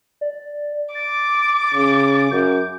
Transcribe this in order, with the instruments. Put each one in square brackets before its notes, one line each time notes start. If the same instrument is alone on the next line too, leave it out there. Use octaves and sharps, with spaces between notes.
[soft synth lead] D5
[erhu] D6 [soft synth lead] A6
[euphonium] C#3
[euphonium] F#2 [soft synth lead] G6